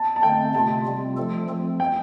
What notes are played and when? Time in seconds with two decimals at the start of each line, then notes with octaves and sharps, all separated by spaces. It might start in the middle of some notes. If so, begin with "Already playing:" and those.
Already playing: A5
0.16 A5
0.23 D3 A3 C4 G5
0.54 C3 A3 F4 A5
0.85 C3 G3 C4 F4
1.17 F3 A3 F4 A4
1.49 F3 A3 C4
1.80 G5